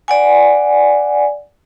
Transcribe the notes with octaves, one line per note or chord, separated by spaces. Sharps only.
D5 F#5 G#5